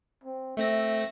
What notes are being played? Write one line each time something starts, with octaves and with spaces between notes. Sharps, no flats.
C4
A3 C4 E5 A#6